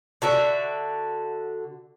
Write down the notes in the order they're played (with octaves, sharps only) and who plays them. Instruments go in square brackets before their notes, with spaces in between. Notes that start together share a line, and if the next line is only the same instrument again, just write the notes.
[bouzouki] D3 F#4 E5